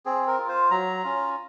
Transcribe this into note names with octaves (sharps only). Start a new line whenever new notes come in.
C4 G#4
A#4
F4
C5
F#3 A#5
C#4 F4